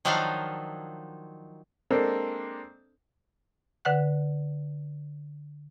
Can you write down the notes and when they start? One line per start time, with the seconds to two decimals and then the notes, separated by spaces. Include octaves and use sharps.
0.05 D#3 F3 F#3 D4 D#4 F5
1.90 G#3 A#3 C4 D4 A4
3.85 D3 B4 F#5 F#6